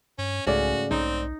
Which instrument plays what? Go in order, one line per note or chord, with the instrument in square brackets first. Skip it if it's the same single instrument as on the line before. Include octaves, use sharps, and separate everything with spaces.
[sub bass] G2 [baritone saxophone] C#4
[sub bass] C2 [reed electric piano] G#2 A3 D5 [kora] C#3 [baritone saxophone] F#4
[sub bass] B1 [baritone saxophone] C4 [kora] D#4